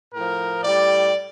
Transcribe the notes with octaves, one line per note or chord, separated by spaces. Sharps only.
A2 F3 A#4
A2 G3 D5